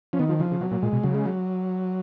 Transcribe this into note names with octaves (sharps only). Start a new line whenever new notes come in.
F3 C#4
D#3 B3
F3
C#3 F3
C#3
B2 F#3
A#2
A#2 G#3
B2
C#3 F#3
G#3
F#3